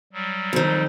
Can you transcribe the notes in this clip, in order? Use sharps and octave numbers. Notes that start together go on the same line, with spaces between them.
F#3 G3
F2 D#3